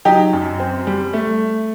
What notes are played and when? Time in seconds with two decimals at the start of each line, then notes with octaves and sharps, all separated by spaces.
0.05 F#3 D#4 G4
0.33 F#2
0.60 C4
0.87 G3
1.13 A3